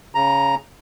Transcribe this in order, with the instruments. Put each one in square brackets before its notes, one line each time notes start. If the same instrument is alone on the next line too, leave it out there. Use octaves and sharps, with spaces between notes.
[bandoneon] C#3 A#5